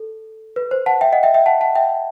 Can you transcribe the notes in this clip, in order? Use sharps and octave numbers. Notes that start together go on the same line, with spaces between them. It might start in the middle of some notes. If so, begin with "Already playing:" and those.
Already playing: A4
B4
C5
F#5 A5
E5 G5
D#5 F#5
E5 G5
E5 G5
F#5 A5
F#5 A5
E5 G5